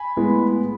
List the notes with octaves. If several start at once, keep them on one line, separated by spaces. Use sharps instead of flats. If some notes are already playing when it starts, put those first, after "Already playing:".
Already playing: G#5 B5
A2 G#3 B3